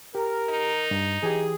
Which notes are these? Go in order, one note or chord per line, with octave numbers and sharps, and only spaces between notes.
G4 A#4
D#4
G2
E3 G4 G#4